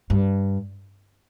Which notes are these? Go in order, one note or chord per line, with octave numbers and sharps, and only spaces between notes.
G2